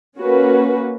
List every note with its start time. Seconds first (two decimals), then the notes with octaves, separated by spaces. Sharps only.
0.19 A#3 C#4 F#4 B4